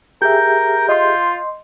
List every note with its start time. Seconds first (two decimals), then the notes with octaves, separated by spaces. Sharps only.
0.22 G4 G#4 A#4 E5 G6
0.89 F4 D#5 C6